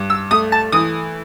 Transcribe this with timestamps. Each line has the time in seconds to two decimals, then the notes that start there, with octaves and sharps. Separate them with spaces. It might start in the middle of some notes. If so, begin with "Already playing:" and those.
Already playing: G2
0.10 E6
0.31 A3 D#6
0.52 A5
0.72 E3 D#6